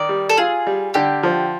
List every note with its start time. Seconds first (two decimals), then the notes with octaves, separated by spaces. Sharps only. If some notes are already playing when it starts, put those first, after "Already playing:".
Already playing: D#3 D5
0.09 G3
0.29 A4
0.38 F4 G#4
0.67 G3
0.94 D3 G4
1.23 F3